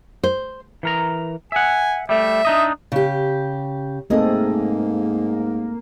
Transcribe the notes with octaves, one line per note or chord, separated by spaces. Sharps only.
C5
E3 A#4 A#5
E5 F#5 G#5
G3 A3 E5
D4 D#4 D#5
C#3 G4
G#2 A3 A#3 C4 G#4 A4 D#5